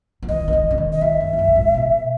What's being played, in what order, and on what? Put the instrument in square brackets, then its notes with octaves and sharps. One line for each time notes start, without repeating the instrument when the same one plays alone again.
[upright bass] D#3
[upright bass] E3 [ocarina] D#5
[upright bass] D#3
E3
C#3
D#3
[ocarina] D#5
[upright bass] D#3 [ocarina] E5
[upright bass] F#2
E2
F#2
A#2
G#2
B2